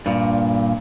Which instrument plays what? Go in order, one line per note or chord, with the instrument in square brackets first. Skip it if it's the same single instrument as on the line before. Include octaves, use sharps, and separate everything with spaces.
[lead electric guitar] G2 A#2